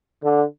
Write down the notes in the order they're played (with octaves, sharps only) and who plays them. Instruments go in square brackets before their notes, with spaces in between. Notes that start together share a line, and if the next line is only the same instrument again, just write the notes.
[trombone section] D3